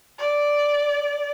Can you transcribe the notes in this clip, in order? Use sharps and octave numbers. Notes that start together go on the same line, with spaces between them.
D5